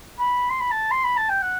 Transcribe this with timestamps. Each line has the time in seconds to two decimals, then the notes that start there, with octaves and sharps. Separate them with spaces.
0.19 B5
0.50 C6
0.60 B5
0.71 A5
0.91 C6
1.04 B5
1.17 A5
1.29 G5
1.42 F#5